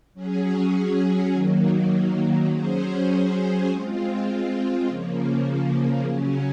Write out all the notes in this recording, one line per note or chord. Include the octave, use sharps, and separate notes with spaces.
F#3 C#4 G#4
D#3 F#3 A#3
F#3 C#4 G#4 C5
G#3 C4 F4
C#3 F3 A#3
C#3 F#3 C#4